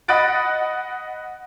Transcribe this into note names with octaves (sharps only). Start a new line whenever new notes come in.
D#5 F#5 B5 F#6 A6 D7